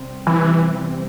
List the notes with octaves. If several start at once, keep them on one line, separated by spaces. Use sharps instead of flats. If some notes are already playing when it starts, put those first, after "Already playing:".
Already playing: C3 G3 C4
E3